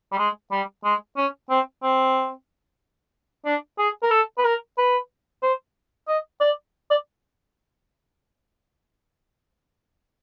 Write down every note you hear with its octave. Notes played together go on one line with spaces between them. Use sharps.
G3
G#3
G3
G#3
C#4
C4
C4
D4
G#4
A#4
A4
B4
A#4
B4
C5
D#5
D5
D5